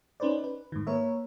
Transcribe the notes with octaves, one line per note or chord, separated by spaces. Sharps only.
C#4 D#4 B4 C5 D5
B4
G#2 D#3
A#3 A#4 B4 C#5 E5